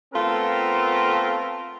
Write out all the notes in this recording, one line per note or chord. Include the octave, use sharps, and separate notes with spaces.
A3 B3 C4 F4 A4 A#4